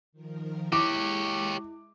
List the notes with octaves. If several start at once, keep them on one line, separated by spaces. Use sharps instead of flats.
D#3 F3 A#4
G#3 E4 G4 C#5 D6